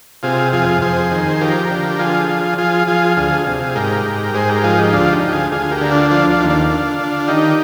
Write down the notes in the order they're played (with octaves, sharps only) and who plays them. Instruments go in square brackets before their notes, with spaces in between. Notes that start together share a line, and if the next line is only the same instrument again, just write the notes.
[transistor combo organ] C3 F4 G#4
F2 F4 G#4
F2 G#4 C5
D#3
G#4
F3 G4 A#4
D3
F3 F4 G#4
F3
F3 F4 G#4
F3 F4 G#4
D2 F4 G#4
C3
G#2 G4 A#4
G#2
G#2 G#4 C5
G4 A#4
F3 F4 G#4
D#4 G4
D2 D4 F4
D#4 G4
D2
F4 G#4
D2 F4 G#4
G4 A#4
D3
D4 F4
F3 D4 F4
D4 F4
D#2
D4 F4
D3
D3
D#3 D#4 G4